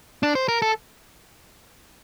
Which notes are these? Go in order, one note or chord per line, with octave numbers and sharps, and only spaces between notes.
D4
C5
A#4
A4